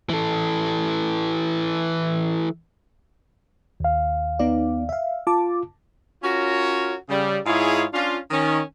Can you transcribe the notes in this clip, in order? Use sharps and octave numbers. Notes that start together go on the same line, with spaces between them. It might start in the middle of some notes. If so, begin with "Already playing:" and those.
E3 A4
D#2 F5
B3 D#4 D5
E5 F5
F4 A5 D6
C#4 F4 F#4 A#4 C#5
C#3 G3
G#2 E4 F4 G#4 C#5
C#4 D4 F4
D#3 C#4